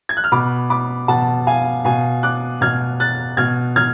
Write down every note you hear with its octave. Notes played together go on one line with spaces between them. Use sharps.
G#6
F#6
F6
B2 B5 D6
B5 D6
B2 F#5 A5
F5 G#5
B2 F5 G#5
D6 F#6
B2 F6 G#6
F#6 A6
B2 F6 G#6
F6 G#6